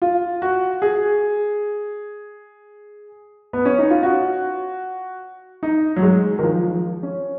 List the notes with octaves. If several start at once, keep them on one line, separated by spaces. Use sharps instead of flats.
F4
F#4
G#4
B3
C#4
D#4
F4
F#4
D#4
F#3
G#3
D#3
F3
F3
C#4